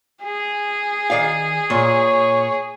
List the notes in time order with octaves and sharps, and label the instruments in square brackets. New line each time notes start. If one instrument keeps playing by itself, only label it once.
[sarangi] G#4
[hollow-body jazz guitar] D#3 D5 F5
[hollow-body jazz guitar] A#2 [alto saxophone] C#5